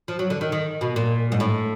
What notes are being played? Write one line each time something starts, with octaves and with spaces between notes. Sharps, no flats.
F3
F#3
D3
D#3
D#3
B2
A#2
G#2
A2